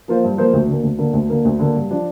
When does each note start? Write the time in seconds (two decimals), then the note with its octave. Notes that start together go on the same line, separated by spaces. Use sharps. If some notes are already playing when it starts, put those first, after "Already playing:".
0.08 F3 A#3 F4 C5
0.23 G2
0.37 F3 A#3 F4 C5
0.53 D2
0.68 D3 A#3
0.83 D2
0.98 D3 A#3
1.13 D2
1.30 D3 A#3
1.45 D2
1.59 D3 A#3
1.75 G2
1.90 F3 D4